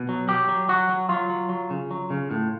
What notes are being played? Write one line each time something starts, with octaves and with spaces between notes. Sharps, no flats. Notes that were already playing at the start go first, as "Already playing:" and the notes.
Already playing: B2
F#3
F#3 G4
F#3
F#3 F#4
F#3
F#3 F4
F#3
F#3
C#3
F#3
C#3
A2